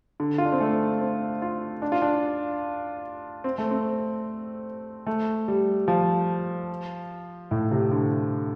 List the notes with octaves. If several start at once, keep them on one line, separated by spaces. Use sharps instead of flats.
D3
F4
D4
C4
A3
C4
F4
D4
F4
D4
C4
A3
C4
A3
G3
F3
A2
C3
D3